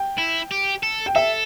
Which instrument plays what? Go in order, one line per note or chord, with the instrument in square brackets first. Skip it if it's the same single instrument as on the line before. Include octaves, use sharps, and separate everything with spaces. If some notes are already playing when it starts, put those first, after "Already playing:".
Already playing: [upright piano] G5
[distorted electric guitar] E4
G4
A4
[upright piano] G5
[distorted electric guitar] A4 [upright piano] E5